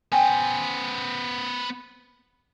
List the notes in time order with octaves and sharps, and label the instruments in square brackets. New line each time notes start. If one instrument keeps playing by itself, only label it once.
[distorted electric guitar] B3 C5 [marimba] G5 G#5